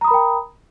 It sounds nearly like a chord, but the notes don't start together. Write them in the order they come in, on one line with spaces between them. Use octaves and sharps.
A#5 D#6 B5 A#4 G5